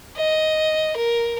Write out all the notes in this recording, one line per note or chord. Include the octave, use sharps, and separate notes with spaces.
D#5
A#4